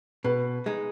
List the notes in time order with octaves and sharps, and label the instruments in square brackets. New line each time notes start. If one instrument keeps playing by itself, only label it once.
[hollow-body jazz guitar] B2 [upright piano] B4
[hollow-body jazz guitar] G#3 D#4